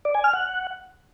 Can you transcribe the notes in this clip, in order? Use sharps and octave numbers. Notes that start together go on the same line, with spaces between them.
D5
G#5
F6
F#5